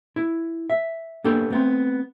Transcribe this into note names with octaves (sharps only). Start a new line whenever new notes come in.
E4
E5
A#3 B3 D4 G4 A4
A3 B3 C4